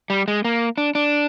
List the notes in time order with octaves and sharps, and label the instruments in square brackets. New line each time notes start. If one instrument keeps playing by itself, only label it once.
[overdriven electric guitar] G3
G#3
A#3
D4
D4